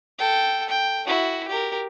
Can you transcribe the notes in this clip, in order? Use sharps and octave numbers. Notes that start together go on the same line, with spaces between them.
A4 G5
G5
E4 F#4
G4 A#4